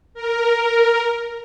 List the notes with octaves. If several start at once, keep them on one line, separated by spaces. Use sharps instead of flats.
A#4